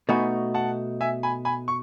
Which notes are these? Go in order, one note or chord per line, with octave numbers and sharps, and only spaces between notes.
B2 A3 D#4 F#4 G#5 B5
F#5 A5
E5 G#5
G#5 B5
G#5 B5
C#6